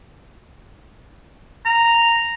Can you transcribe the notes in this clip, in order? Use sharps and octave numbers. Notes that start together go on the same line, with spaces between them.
A#5